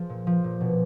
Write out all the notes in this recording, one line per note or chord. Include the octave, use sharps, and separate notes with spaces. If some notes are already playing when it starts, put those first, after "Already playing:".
Already playing: F3 G#4
A#2
F3
A#2
B2